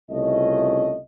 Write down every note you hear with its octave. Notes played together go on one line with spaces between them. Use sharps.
C2 C#3 A3 C#4 F4 D#5